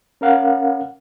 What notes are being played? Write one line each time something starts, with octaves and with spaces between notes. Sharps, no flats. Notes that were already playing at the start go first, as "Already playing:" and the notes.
C#4 A#4 F5 F#5